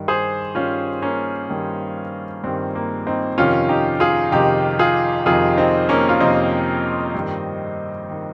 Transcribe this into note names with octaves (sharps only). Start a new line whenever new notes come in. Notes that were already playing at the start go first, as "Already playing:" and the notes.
Already playing: G2 D#3
G#4 C5
G2 D#3 C#4 F4
A#3 C#4
G2 D#3
G2 D#3 C4
A#3
C4 D#4
F2 C3 D#3 C#4 F4
D#4 G4
F4 G#4
F2 C3 D#3 D#4 G4
F4 G#4
F2 C3 D#3 F4 G#4
C4 D#4
A#3 C#4
F4
F2 C3 D#3 C4 D#4
G2 D#3
D#3